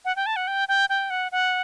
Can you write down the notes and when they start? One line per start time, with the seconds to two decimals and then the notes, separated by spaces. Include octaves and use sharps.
0.05 F#5
0.16 G5
0.26 A5
0.36 F#5
0.47 G5
0.68 G5
0.89 G5
1.10 F#5
1.32 F#5